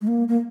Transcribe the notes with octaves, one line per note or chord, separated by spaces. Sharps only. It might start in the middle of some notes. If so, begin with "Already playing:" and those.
G#3
A#3
A#3